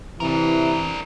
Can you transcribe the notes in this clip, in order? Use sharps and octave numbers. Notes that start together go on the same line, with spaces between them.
C3 E3 D4 A#4